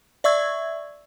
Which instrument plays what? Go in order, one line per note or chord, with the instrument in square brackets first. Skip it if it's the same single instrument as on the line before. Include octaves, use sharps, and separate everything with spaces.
[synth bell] D5 E5 C#6 E6 G#6